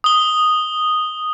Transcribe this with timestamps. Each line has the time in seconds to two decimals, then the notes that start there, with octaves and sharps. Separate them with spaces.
0.04 D#6 G7